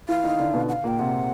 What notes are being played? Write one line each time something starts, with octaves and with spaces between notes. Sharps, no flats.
E3 E4 F5
D#3 D#4
D3 D4
B2 B3
F#5
F5
A#2 A#3 G5
C3 C4 F#5